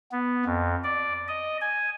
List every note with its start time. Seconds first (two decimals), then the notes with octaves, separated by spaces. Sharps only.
0.12 B3
0.45 F2
0.84 D5
1.28 D#5
1.61 G#5